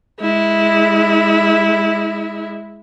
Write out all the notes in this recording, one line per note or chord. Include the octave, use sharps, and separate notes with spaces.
G#3 E4